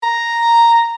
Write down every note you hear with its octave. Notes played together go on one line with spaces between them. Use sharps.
A#5